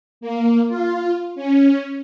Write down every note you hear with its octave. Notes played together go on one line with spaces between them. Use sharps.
A#3
F4
C#4